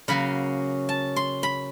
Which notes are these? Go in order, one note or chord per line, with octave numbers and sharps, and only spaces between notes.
C#3 F#3 A#3 C#4 B5
A5
C6
B5